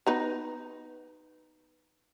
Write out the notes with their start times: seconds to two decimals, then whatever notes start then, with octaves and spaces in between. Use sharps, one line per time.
0.07 B3 D#4 B4